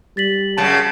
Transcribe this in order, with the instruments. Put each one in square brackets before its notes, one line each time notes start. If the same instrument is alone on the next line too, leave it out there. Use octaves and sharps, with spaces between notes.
[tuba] G3 [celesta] A6 B6 F#7
[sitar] F#2 C#3 [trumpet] A5